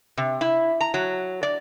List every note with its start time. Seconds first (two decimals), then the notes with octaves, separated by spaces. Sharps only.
0.17 C3
0.41 E4
0.81 A#5
0.94 F#3
1.43 D5